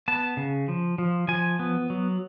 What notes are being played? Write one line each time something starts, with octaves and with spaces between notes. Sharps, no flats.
B3 A5
C#3
F3
F3
F3 G#5
B3
F#3